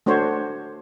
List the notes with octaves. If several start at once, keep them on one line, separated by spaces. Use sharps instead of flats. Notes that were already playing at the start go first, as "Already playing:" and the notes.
A3 D4 F#4 C5 C#5